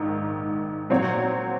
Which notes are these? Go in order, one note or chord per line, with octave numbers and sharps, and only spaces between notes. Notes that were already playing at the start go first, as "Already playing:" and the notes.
Already playing: A#1 G#2 D#3
A#2 F#3 C4 F#4 C#5